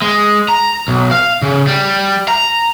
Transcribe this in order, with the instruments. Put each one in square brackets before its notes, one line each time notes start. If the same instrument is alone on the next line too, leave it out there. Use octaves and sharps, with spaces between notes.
[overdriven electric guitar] G#3
A#5
B1
F5
C#3
G3
A#5